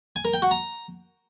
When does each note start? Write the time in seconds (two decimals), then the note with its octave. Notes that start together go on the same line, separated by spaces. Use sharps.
0.16 G#5
0.25 A#4
0.34 G5
0.42 F#4
0.51 A#5